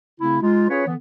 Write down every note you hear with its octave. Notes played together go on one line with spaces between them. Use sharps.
C#3 A3 C4 E4
G#3 D#4 F4
C#4 F4 G#4 B4 C#5
D3 E3 B3